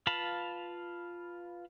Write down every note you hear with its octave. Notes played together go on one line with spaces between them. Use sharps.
F4 B4 F5 A5 B5